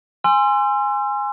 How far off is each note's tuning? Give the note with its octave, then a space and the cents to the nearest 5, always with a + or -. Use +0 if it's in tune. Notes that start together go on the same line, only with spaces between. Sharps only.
G#5 -10 C6 +0 E6 +40